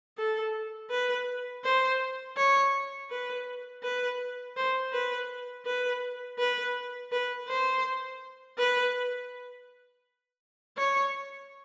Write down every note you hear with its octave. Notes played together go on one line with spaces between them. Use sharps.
A4
B4
C5
C#5
B4
B4
C5
B4
B4
B4
B4
C5
B4
C#5